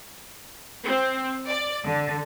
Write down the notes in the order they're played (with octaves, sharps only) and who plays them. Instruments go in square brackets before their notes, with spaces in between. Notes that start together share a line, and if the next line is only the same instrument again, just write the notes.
[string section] C4
D5
D3